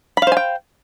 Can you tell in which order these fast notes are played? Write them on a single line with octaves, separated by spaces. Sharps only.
B5 F5 C5 G#5 G5